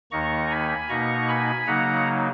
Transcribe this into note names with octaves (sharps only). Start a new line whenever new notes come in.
D#2 D#3 A#3 D#4 A#5 C#6
G#5 B5
B2 A#3 D#4 A#5 C#6
G#5 B5
C#3 F#3 A#3 D#4 F#5 A#5